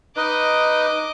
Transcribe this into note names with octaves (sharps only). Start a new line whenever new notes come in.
D#4 B4 D#5 D6